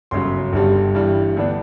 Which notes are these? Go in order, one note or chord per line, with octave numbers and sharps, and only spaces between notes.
G1 F#2 C#3 F#3 C6
G1 G2 D3 G3
G2 E3 G3
D2 D3 G3 B3 D4